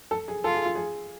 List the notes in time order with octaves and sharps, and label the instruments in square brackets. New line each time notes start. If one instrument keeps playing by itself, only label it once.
[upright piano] A4
G#4
[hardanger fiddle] F4 [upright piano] A4
[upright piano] G#4
F4
G#4